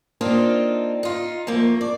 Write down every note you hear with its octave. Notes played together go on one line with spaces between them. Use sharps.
A#3 C4 D4 D#4 F4
D#4 F4
F2 A3 A#3
D5